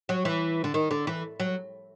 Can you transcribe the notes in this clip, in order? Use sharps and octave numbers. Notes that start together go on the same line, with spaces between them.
F#3
E3
D3
D#3
D3
E3
F#3